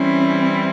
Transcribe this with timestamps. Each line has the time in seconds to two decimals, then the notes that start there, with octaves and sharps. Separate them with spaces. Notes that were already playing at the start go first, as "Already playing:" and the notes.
Already playing: E3 G3 C4 C#4 E4